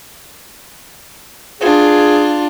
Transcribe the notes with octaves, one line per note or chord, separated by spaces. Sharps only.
D4 F4 G#4